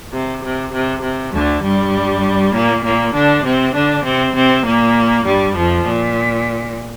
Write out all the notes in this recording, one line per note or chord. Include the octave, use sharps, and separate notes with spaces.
C3
C3
C3
C3
D2 D3
G2 G3
A#2 A#3
A#2 A#3
D3 D4
C3 C4
D3 D4
C3 C4
C3 C4
A#2 A#3
G2 G3
F2 F3
A#2